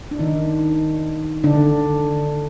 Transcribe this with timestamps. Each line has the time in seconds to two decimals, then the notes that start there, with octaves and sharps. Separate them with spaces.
0.11 D4
0.19 D#3 D#4
1.44 D3 D4